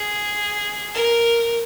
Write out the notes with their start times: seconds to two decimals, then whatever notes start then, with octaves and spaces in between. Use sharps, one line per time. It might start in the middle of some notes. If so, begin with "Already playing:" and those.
Already playing: G#4
0.94 A#4